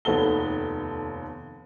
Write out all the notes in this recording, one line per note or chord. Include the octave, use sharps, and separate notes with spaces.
F1 D#2 B3 A4 G7